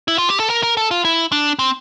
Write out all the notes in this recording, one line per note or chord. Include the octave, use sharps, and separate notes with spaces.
E4
F4
G4
A4
A#4
A#4
A4
F4
E4
D4
C4